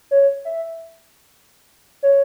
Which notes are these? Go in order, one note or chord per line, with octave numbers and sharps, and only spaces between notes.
C#5
E5
C#5